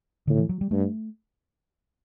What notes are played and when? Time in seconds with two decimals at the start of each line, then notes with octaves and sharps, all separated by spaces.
0.27 A2 D3
0.38 E3
0.49 F#3
0.61 G3
0.71 G2 A3